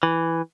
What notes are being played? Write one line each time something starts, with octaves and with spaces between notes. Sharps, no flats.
E3